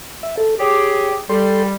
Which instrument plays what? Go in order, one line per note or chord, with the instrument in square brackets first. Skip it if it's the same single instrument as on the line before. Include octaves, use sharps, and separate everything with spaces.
[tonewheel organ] E5
A4
[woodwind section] G4 G#4 [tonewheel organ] C#5
[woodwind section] G3 [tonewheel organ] A4 G5 C6